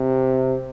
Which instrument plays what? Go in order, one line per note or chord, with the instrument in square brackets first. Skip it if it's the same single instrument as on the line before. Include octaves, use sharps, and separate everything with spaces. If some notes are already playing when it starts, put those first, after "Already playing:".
Already playing: [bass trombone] C3